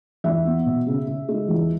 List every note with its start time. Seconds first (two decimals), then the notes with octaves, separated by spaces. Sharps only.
0.24 E2 E5
0.46 B3
0.66 B2
0.87 C#3
1.07 C#3
1.28 G#3
1.49 E2